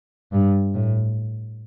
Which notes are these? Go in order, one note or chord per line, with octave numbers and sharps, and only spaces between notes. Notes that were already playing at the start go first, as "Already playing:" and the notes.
G2
A2